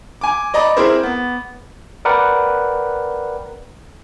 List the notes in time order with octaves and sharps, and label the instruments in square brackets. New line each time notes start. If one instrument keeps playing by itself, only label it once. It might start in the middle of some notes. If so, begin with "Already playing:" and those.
[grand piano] G#5 D6
D5 D#5 A#5 B5 D6
C4 E4 G#4 A#4 C5
B3
[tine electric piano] A#4 B4 D5 F#5 G5